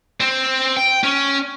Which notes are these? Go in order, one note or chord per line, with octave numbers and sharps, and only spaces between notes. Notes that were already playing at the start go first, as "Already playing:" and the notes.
C4
G5
C#4